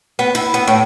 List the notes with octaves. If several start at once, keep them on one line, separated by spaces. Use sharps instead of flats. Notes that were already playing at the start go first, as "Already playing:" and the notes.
B3
E4
B3
A2